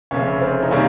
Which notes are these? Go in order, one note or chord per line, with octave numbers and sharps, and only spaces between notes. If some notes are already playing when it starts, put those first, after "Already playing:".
F1 F2 C#3 C#4
C4
D#4
C3 D#3 G3 A#3 C#4